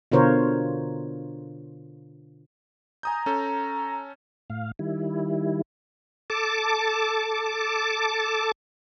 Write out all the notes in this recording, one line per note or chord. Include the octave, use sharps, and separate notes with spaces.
B2 D3 F4 A#4 C5 C#5
G#5 A#5 D#6 G6
C#4 A4
A2 F5
D#3 G3 E4
A4 A5 D6